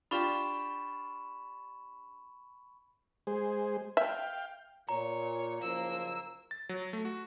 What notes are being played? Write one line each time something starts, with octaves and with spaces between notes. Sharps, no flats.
D4 F4 G4 B5 C#6 E7
G#3 G#4 C5
E5 F5 G5
A#2 C#5 A#5
F#1 F3 A#3 E6
A6
F#3
A3
F#4